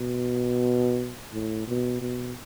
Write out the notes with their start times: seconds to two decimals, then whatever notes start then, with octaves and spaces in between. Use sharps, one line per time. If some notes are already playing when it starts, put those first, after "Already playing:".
Already playing: B2
1.32 A2
1.67 B2
2.01 B2